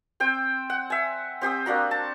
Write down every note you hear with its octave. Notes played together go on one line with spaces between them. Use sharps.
C4 C5 G5
F#5
E5 G#5
C4 G4 C5 D#6
A#3 D4 F#4 A#5
A5